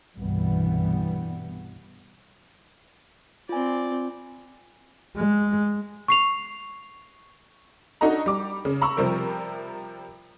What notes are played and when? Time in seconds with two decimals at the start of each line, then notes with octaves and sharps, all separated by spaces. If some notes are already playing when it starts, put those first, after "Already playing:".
0.17 C2 G2 B2 E3 G3 B3
3.49 C4 F4 D5 G#5
5.17 G#3
6.08 C#6 C7 F7
8.01 D4 D#4 F#4 A4 D#5 A#5
8.26 G3 D6
8.65 C#3
8.81 A#5 B5 C#6 E6
8.97 C3 F3 G3 A#4